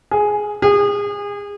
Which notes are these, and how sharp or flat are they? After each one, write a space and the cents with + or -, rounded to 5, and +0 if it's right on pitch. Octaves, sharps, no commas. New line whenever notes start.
G#4 +5
G#4 -30